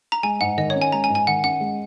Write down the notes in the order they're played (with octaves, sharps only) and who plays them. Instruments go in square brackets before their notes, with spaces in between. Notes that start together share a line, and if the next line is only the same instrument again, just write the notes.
[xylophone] A#5
[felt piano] G#3 [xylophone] G#5
[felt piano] G#2 [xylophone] F#5
[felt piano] D#3 [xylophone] D#5
[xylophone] C#5
[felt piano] C#4
[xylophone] G#5
[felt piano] G#3 [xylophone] A#5
[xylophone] G#5
[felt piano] G#2
[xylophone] G#5
[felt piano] D#3 [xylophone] F#5
[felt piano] C#4 [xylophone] F#5
[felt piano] G#3